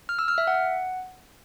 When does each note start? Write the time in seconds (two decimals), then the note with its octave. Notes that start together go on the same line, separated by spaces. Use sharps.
0.09 F6
0.19 E6
0.28 F6
0.38 E5
0.47 F#5